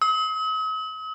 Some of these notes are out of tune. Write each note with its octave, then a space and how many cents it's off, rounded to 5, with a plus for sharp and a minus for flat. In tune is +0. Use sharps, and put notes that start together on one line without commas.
D#6 +45